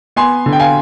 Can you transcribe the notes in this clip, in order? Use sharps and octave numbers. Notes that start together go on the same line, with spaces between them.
B3 G#5 C6
D3
G5
F5 G#5